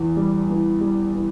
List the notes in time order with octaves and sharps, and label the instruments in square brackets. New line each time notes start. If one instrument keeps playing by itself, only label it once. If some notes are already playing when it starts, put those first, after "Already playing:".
Already playing: [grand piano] E2 E3
G3
E3
G3
E3